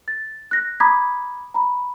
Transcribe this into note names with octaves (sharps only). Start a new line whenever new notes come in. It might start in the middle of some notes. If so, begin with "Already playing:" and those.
A6
F#6 A#6
A#5 B5 D6 D#6 G#6 B6
A#5 B5